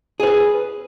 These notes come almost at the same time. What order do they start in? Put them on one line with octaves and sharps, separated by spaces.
G#4 C5 B4